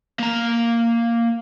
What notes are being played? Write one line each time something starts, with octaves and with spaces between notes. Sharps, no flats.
A#3 A#5